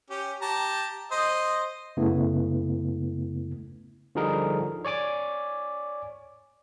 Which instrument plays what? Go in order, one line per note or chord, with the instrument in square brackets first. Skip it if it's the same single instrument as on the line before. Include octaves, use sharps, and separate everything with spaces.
[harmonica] C#4 G4
G4 A5 A#5
C5 D#5
[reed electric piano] F#2 C#3 A3 B3 E4
[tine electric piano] D3 F3 G3 D#4 G#4 A#4
C#5 D5 G#5 D6